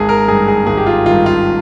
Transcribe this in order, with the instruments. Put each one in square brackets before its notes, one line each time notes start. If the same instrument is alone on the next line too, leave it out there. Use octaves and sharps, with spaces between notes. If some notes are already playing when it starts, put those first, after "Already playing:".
Already playing: [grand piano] G#1 G#4
A#4
G2 D#3 G#4
G#4
G#1 G#4
G4
F4
G2 D#3 F4
F4